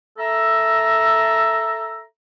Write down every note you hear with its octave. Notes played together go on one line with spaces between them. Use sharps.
A4 E5 A#5